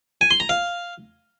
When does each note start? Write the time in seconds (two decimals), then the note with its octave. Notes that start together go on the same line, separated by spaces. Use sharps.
0.21 G#5
0.31 C6
0.40 A#5
0.49 F5